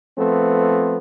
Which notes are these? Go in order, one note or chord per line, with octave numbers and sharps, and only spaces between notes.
F3 A3 B3 C4